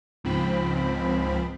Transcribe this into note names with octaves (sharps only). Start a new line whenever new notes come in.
C#2 G#2 F3 C4 B5